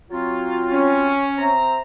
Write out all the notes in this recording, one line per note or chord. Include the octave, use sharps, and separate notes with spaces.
F#3 C4 F4
C#4
C4 E5 A#5